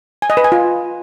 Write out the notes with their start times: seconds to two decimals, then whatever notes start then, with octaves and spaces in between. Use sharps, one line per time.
0.22 G#5
0.30 D#5
0.37 B4
0.44 G#5
0.52 F4